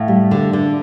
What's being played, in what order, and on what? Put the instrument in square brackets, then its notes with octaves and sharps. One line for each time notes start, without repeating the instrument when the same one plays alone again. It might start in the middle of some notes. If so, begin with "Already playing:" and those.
Already playing: [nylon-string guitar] A2 F5
G3
D3
D3